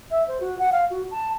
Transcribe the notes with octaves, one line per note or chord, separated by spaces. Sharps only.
E5
C5
F#4
F#5
F5
F#4
A5